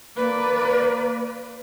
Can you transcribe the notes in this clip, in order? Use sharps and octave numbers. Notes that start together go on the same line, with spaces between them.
A#3 B4 D5